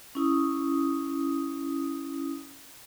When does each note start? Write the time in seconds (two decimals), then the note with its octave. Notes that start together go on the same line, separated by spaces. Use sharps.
0.15 C#4 E4 D#6